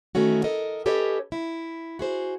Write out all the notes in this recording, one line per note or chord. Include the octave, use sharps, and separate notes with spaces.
D#3 E3 A3 C#4 F#4
A4 A#4 D#5
C#4 G4 A4 B4 C#5 D#5
E4
F#4 G#4 C5